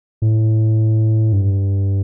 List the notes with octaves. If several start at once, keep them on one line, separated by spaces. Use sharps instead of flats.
A2
G2